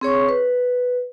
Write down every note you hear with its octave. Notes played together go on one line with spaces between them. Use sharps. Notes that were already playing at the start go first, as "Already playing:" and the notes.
C4 G#4 C#5 C#6
B4